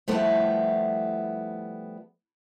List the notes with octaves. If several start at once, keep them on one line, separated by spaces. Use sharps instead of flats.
F3 G3 A3 B3 E4